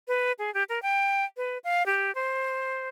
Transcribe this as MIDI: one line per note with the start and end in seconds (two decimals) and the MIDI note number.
0.08 0.32 71
0.39 0.53 68
0.54 0.63 67
0.69 0.81 70
0.82 1.25 79
1.37 1.58 71
1.64 1.85 77
1.86 2.13 67
2.15 2.89 72